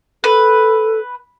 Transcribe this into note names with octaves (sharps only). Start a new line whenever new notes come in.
A4 B4